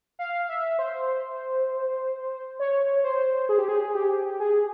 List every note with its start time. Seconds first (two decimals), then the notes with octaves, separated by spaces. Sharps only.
0.19 F5
0.49 E5
0.79 C5
2.60 C#5
3.04 C5
3.49 G#4
3.58 G4
3.68 G#4
3.95 G4
4.40 G#4